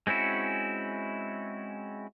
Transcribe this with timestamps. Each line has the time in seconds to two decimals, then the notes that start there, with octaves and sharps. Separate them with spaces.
0.07 G#3 C4 C#4 E4 F#4